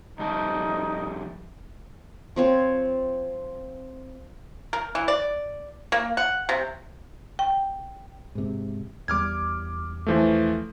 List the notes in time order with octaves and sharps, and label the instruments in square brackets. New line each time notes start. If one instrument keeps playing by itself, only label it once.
[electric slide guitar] F2 G3 A5 [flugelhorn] D#4
[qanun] F3 C4 C#5
[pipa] A#4
E3
D5
A#3
F#5
C3
[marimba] G5
[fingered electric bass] G#2 C3
[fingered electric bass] E2 G3 [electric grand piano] D6 F6 G#6
[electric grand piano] E3 F3 A3